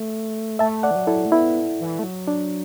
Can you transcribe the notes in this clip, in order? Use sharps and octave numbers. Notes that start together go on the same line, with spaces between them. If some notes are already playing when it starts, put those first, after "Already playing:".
Already playing: A3
A3 E5 A5
D5 F#5
E3
F#3
E4 A4
A3
B3 E4
E3
A3
F#3
D4